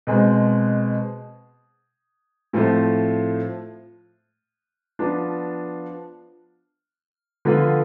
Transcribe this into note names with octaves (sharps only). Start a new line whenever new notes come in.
B2 G#3 C4
A2 F3 A3 C4
F3 B3 D4 F4
D3 F3 B3 F4